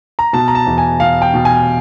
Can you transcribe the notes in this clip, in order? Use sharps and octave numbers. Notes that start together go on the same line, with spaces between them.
A#5
B2 A5
A#5
A5
E2
G#5
B2 F5
G5
B2
G#5